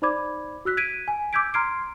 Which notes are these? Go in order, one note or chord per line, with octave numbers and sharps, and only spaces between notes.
D#4 C5 D5 B5 D6 G#6
F#4 E6 F#6 B6
G#6 B6 D7 D#7
G#5
D6 E6 G6 G#6 B6 D7
A#5 C6 F6 G#6 C7 D7